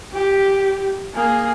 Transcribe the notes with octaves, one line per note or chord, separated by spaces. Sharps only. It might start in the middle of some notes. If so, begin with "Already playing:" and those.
G4
A#3 G#4